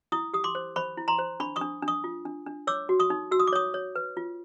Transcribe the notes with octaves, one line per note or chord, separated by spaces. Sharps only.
E4 C#6 D#6
G4 D#6
C6 D6
C5
C5 B5 C#6
E4
A#5 C6
C5
D4 B5 C#6
C#6 D#6
D4
D4
C#6 D#6
F4
D4
D4
C#5 D6 E6
F#4
C#6 D#6
D#4
F#4 E6
D#6
D6
C#5 C#6 D#6
C#5
B4
F4